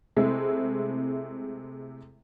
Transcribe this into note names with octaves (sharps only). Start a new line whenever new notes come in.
C3 G#3 A3 C4 E4